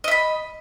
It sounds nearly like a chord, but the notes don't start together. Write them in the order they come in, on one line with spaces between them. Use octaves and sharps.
D#5 E5 B5